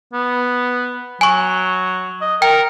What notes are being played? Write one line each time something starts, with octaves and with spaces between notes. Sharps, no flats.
B3
F#3 G#5 C#6
D#5
A#4 G5